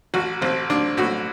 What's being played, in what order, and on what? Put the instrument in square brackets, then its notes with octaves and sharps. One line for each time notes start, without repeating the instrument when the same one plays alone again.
[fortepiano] A1 F#4
A1 C4
A1 D4
A2 F#4